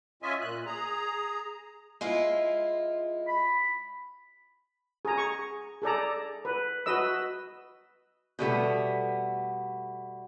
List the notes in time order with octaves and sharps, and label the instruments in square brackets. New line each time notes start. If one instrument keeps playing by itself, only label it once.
[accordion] C#4 F4 D#5 E5 G#5
A#2 F#6
G#4 A#5
[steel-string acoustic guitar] G#3 E4 F4
[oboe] B5
[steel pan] G#4 A#5
C#6
G#4 A4 D5 A#5
B4
F#4 B4 D#5 E6
[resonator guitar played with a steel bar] B2 G3 A3 B3